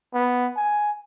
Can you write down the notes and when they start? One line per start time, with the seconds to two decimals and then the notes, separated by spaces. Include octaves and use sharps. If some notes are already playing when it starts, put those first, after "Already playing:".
0.14 B3
0.57 G#5